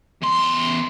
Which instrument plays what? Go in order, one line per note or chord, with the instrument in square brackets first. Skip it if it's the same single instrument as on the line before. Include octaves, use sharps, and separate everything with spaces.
[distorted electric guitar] E2 C6